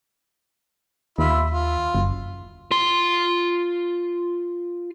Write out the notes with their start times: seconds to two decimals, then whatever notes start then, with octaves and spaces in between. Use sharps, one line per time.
1.18 D#2 F4 E5 B5
1.50 F4
1.95 F#1
2.71 F4 C6